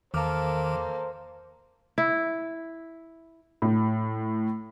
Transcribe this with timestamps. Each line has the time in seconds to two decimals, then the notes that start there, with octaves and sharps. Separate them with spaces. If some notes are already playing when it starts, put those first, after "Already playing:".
0.14 E2 D#3 A#3 A4 C5 D6 F6
1.98 E4
3.62 A2